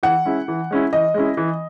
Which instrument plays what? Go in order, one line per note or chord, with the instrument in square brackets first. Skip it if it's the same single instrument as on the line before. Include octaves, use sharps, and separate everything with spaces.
[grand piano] E3 [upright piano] F#5
[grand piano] G#3 C#4 E4
E3
G#3 C#4 E4
[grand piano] E3 [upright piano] D#5
[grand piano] G#3 C#4 E4
E3